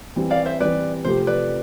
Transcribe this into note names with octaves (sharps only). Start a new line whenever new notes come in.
E3 G3 C4
D5 F5
C5 E5
E3 G3 C4 B4 D5
C3 F3 A3 C4 G4 C5
B4 D5